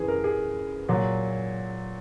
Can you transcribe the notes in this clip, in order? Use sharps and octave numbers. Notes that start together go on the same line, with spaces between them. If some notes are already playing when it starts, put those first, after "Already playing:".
Already playing: F#2 E3 G#4 B4
A#4
G#4
A#2 F#3